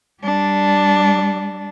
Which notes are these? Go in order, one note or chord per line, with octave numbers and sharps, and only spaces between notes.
G3 D4